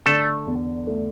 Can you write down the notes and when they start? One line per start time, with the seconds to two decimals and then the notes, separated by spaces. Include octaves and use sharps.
0.06 D3 A3 A4
0.47 E2
0.87 A3